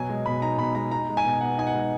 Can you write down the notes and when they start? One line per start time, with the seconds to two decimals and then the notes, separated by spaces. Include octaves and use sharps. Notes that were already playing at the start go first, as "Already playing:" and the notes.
Already playing: B2 F#3 G#5
0.09 G#3
0.26 B2 B5
0.42 D#4 A#5
0.58 B2 B5
0.75 G#3 A#5
0.91 D#4 A#5
1.09 G#3
1.17 G#5
1.24 B2
1.41 B3 F#5
1.57 D#4 G#5
1.67 F#5
1.74 G#3